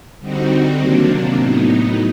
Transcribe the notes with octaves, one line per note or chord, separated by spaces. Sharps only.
D3 G3 C4 D#4 F#4
C3 D#3 F#3 A#3 D4
A2 F#3 B3 D#4